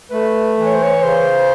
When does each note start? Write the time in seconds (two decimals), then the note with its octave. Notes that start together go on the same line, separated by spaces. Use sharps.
0.11 A3 B4
0.58 E3
0.66 C#5
0.74 C5
0.83 C#5
1.02 C#3 C5